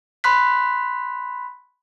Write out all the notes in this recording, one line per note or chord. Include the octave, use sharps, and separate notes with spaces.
B5 C6 F#6 B6